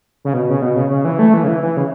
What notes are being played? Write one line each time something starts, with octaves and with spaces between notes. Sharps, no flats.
C#3
B2
C#3
B2
C#3
C#3
E3
A3
E3
C#3
E3
E3
C#3